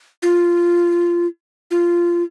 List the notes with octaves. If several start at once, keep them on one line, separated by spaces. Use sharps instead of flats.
F4
F4